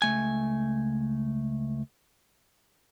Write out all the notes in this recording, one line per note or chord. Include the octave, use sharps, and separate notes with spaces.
C#2 A3 G#5